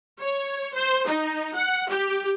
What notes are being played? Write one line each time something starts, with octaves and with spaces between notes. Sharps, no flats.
C#5
C5
D#4
F#5
G4